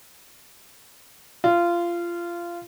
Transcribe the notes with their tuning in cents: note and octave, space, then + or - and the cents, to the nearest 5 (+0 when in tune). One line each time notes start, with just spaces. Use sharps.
F4 -20